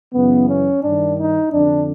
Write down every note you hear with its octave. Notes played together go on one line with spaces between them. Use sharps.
F#2 C#3 E3 B3
C#4
G2 D#3 D4
D#4
F2 D3 D4